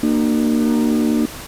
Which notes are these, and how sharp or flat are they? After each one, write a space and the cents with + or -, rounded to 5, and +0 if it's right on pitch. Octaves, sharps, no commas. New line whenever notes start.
A#3 +0 D4 +45 F#4 +25